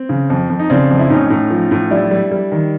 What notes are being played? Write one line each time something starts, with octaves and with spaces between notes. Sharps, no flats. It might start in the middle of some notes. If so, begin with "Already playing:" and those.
Already playing: C4
C#3
F2
F2
D#4
C#3 C4 D4
F2
E4
A2 C#4 D#4
A2
F3
A2
G3 D4 E4
G3
G3
D#3